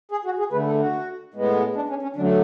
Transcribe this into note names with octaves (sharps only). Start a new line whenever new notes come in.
G#4
F#4
G#4
D3 A3 B4
A4
F#4
A2 G#3 B3
D4
C#4
C#4
D3 F#3 A3 D4